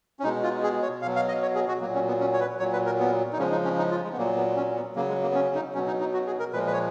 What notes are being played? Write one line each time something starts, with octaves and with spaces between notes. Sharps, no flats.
C#4
B2 G#3 D#4
F4
G#4
C#5
B2 F#3 F5
F5
D#5
C#5
G#4
F#4
A#2 F#3 A#3
C#4
B3
C#4
C#5
B4
A#2 F#3 C#5
B4
A#4
B3
D#4
C#3 F3 G#3 C#4
D#4
C#4
D#4
F4
G#3
B3
A#2 F#3 A#3
B3
C#4
B3
C#3 F#3 A#3
G#3
A#3
B3
C#4
D#4
B2 F#3 C#4
D#4
D#4
F#4
G#4
A#4
A#2 F3 G#3 B4
B4
C#5